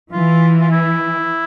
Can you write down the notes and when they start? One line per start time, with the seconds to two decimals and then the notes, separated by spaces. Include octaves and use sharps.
0.12 E3 F4
0.60 F4
0.71 E4